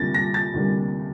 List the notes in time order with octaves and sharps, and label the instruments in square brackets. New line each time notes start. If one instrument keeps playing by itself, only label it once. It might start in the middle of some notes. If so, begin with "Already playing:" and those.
Already playing: [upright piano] D2 C3 G3 A#3 A6 A#6
A#6
A6
D2 C3 G3 A#3